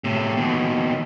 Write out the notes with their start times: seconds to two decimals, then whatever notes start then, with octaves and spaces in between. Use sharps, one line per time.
0.04 A2 C3
0.37 D#2 B2